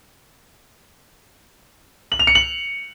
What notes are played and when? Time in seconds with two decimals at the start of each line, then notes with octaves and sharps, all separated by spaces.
2.12 F#7
2.19 F7
2.27 C#7
2.35 F#7